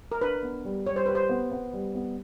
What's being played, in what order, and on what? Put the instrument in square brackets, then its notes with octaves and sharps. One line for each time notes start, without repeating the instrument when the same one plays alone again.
[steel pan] A#4
[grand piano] D4 [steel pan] B4
[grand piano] B3
G3
[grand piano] G3 [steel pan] C#5
[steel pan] C5
[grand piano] G4 [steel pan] B4
[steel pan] C5
[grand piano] B3
B3
G3
B3